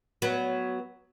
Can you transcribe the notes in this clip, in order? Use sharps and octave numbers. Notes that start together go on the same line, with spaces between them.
F#3 B3